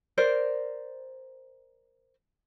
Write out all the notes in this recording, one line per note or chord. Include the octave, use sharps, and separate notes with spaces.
A#4 C5 D5